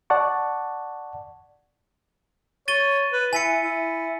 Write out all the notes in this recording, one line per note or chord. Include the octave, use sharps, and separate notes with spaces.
D5 F#5 A5 C#6
C#5 A6 D#7 G7
B4
E4 G#5 B6 C#7
E4